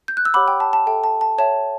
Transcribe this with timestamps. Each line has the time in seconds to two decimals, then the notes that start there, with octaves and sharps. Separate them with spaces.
0.08 G6
0.17 F#6
0.25 E6
0.34 G4 C#5 F#5 B5 D6
0.48 G5 B5
0.60 A5
0.73 A5
0.87 A4 E5 G5
1.04 A5
1.21 A5
1.38 C#5 E5 G5 A5